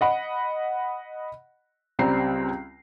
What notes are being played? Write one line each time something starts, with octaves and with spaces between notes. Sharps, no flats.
D#5 F#5 B5
C#2 G3 C4 A#5 C7